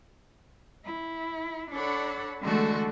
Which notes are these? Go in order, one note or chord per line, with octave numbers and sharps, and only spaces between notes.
E4
D4 A4 C#5 D5 F#5 B5
D3 E3 G#3 A3 F#4 A4